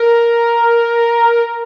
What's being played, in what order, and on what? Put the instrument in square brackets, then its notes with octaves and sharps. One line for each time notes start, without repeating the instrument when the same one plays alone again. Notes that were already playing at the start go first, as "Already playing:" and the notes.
Already playing: [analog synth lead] A#4